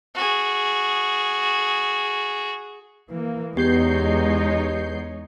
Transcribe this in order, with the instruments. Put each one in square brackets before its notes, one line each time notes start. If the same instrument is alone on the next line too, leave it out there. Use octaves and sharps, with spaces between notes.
[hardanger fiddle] F#4 G#4
[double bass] E3 [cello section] A#3
[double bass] E2 [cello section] G#3 D#4 C#5 [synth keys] B3 G6 C7 [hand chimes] G4